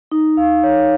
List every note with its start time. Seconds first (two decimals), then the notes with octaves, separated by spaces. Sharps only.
0.11 D#4
0.37 F5
0.63 C#5